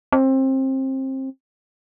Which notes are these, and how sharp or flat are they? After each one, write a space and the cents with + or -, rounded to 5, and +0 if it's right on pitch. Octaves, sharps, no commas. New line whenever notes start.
C4 +25